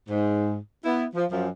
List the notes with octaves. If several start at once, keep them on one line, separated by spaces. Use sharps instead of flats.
G#2
B3 E4
F3
F#2 F3